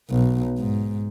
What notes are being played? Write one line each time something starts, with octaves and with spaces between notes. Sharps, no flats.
B1
G#2